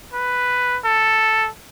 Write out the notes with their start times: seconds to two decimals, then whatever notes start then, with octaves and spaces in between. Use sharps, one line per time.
0.14 B4
0.85 A4